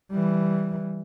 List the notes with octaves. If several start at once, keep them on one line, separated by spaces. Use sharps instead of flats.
E3 G3